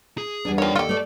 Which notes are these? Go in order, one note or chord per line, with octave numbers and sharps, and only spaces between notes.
G#4
E2 G3 D4
D#3 F3 C#5 G5
D#2 F4 G4 A4
A3 D5